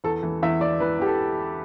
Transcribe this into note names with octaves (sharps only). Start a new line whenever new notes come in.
E2 A4
E3
E2 E5
E2 D5
E3 B4
E2 G4
A4